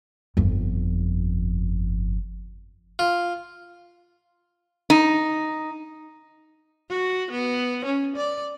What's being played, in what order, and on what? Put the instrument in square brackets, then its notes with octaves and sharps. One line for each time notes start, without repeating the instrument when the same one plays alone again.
[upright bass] G1 F2
[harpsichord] F4
[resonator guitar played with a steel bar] D#4
[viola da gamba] F#4
B3
C#4
D5